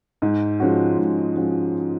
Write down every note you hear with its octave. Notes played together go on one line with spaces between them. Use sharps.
G#2
F3 G#3 C#4 F#4
G#2
F3 G#3 C#4 F#4